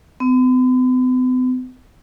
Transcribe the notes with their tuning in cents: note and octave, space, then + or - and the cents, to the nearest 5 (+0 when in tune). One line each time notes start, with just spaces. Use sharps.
B3 +45